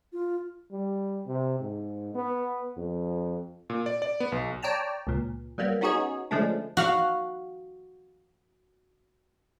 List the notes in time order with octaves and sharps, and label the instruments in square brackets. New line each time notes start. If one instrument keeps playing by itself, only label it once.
[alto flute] F4
[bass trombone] G3
C3
G#2
B3
F2
[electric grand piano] A#2
D5
D5
B3
B1
[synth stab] C#5 D5 G5 A5 A#5
C#2 A#2
F#3 G3 A#3 B3
B3 C#4 D#4 F#4 G#4 C#5
D3 F3 G#3 A3 C#4 D4
[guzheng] F#4 F5 F#5